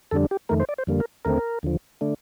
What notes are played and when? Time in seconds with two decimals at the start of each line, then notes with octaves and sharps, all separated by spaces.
0.11 F2 D3 G3 D4 A4
0.31 G4
0.49 F2 D#3 A3 A#4
0.60 C5
0.69 D5
0.78 C5
0.87 F2 D3 G3 A#3
1.00 A#4
1.25 D#2 D3 A3 C4 A#4
1.63 D#2 D3 F3
2.01 D3 A3 D4